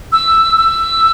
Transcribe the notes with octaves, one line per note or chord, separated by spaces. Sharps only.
E6
E6